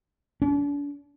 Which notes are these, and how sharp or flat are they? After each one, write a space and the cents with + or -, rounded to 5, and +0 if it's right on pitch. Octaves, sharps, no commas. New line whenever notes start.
D4 -40